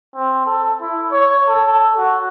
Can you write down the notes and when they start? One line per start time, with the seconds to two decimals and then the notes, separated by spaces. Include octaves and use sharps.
0.15 C4
0.46 A4
0.81 E4
1.12 C#5
1.48 A4
1.97 F#4